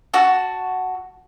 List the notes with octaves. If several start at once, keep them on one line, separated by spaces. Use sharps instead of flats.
F#4 A5